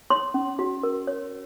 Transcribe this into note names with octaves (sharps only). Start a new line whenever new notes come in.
C#5 C6
C#4
F#4
A#4
C#5